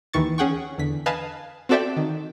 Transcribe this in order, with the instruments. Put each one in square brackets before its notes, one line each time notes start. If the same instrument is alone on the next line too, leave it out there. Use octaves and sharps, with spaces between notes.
[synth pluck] D#2 D#3 E3 C#6 A6
C#4 G#4 F#5 G5 C#6
E2 D3 B6
B4 D#5 F5 G#5 A5
C4 F#4 A4 D5 E5 G5
D#3